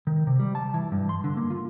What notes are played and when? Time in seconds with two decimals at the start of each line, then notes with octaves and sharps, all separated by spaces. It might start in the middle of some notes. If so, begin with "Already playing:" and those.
0.07 D#3
0.27 C3
0.39 G3
0.55 A5
0.74 E3
0.92 G2
1.09 C6
1.24 D3
1.37 A#3
1.50 F4